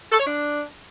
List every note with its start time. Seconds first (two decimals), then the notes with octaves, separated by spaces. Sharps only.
0.12 A4
0.20 C#5
0.27 D4